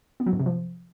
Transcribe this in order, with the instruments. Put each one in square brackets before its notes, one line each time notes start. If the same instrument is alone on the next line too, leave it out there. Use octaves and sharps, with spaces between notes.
[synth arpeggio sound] B3
F#3
G2
C3
F3